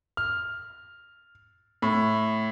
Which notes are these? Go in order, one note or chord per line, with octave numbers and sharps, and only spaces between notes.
F6
A2